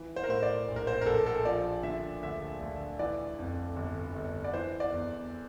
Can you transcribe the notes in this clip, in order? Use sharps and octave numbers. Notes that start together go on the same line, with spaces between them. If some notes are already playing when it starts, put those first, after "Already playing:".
Already playing: E3
C5
A#4
A2 C5
D5
A#1
A#4
C5
A#4
A#1 A4
A4
F3 D5
D3 E5
D2 E5
D2
E3 D5
F2
G1
G1
D5
E3 C5
D5
E2